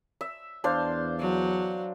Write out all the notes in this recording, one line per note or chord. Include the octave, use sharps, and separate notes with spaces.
E5
E2 D4 C5 F5
F#3